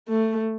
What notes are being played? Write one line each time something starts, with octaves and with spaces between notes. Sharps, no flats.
A3